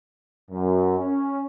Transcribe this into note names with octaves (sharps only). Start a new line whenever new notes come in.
F#2
C#4